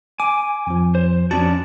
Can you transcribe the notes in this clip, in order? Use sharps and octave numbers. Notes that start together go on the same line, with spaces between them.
G#5 D6
F2 F3
C5
F2 C#4 D4 F#4 A5